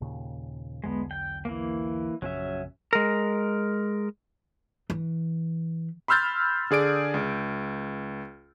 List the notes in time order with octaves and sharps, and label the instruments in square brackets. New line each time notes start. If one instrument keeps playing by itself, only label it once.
[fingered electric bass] D#2 A#2 C#3
[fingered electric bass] B1 E2 D3 [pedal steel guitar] G#3 B3
[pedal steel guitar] G5
E3 A#3
[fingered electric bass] A#1 F#2 C#3 [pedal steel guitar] F#3 C#4 E5
[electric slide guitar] G#3 A#4
[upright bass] E3
[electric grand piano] B5 C6 E6 F6 G6 A6
D3 G#4 D5 D7
C#2